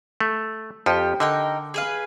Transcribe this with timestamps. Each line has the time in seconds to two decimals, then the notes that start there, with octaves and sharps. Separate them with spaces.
0.21 A3
0.86 F2 F3 G4
1.20 D3 D#4 A#4 G5
1.74 G#4 B4 F5